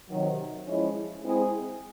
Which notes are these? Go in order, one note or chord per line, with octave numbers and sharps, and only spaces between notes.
C3 D#3 F#3
F3 G#3 C#4 E4
G#3 C4 E4 G#4